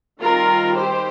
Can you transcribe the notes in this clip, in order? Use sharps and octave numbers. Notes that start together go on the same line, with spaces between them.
D#3 G3 C4 F4 A#4
G4 C5